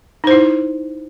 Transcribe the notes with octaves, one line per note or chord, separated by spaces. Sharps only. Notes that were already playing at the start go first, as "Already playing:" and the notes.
D#4 E4 C5